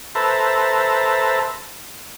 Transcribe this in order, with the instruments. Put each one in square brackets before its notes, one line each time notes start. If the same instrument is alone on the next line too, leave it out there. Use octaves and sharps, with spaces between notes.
[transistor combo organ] A4 B4 C5 E5 A5 A#5